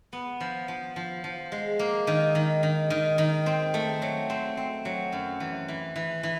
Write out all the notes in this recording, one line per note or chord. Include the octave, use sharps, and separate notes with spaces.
B3
F3
F3
F3
F3
G#3
A#3
D#3
D#3
D#3
D#3
D#3
C4
A3
F#3
C4
C4
F#3
F#2
E3
E3
E3
E3